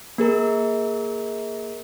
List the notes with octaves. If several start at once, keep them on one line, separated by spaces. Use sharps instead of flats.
A#3 G#4 A#4